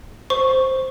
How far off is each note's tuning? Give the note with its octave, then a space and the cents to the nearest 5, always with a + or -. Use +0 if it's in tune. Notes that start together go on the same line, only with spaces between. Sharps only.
C5 +0 C#6 +0